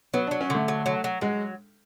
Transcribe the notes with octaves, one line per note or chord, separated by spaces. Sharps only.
F#3 B3
F#3 D4
C#4
D3 A3
F#3
F#3
F#3
F#3 G#3